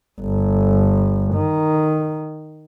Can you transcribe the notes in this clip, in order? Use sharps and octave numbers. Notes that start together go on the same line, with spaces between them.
G1
D#3